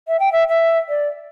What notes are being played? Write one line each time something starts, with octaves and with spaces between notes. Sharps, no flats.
E5
G5
E5
E5
D5